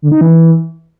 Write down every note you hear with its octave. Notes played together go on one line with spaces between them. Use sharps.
D3
D#4
E3